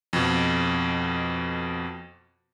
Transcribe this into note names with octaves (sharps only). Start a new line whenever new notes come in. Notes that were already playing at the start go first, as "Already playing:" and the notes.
F2 B2